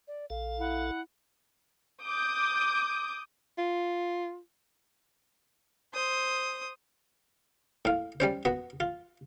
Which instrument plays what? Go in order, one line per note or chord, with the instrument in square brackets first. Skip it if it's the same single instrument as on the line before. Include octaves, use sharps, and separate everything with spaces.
[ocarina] D5
[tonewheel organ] A#1 A4 [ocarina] F5
[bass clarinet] E4 [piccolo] F#5
[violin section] D6 D#6 G6
[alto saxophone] F4
[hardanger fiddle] C5 D#6
[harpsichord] A2 F5
G3 C#4 C5
B3 F#4
F4